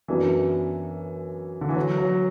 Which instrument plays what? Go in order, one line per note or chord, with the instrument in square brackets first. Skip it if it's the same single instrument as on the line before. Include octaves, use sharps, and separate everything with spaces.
[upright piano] F#2 F#3 B3 D4 [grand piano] E3
[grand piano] D3
E3
F#3
F#3